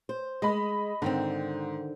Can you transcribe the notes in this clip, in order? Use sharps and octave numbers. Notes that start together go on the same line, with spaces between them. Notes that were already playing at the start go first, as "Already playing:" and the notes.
C5
G#3 D#5 B5
G#2 D3 D#3 C4